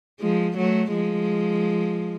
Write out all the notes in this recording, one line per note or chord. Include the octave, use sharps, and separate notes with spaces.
F3 G#3
F#3 A3
F3 G#3